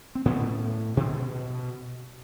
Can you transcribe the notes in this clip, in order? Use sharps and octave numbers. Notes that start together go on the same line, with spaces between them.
C4
A2 B3 C#4
B2